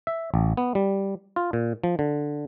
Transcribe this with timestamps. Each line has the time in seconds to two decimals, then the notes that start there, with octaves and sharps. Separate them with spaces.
0.07 E5
0.34 A1
0.57 B3
0.75 G3
1.36 F4
1.53 A#2
1.84 F3
1.99 D3